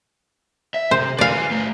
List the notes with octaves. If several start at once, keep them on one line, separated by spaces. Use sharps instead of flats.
E5
C3 C5
B4 D5 F5 G#5
A3 B4